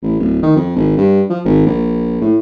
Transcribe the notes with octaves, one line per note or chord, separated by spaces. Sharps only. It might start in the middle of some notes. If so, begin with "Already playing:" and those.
A1
D1
D#3
F2
G#1
G2
F3
G#1
A#1
A2